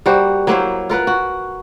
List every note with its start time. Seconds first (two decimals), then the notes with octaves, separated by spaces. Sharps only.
0.06 G3 A#3 F#4 C5
0.47 F#3 A#3 E4 C5
0.90 F4 A#4 B4 F#5
1.07 F#4